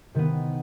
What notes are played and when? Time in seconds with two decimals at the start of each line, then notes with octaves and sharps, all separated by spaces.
0.15 C3 D#3 B3